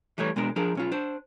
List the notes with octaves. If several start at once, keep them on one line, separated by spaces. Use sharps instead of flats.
E3 G3 A3 C#5
B2 G#3 B3 D4 A#4
F3 D4 G#4 A#4
B1 C#4 F4
D4 C5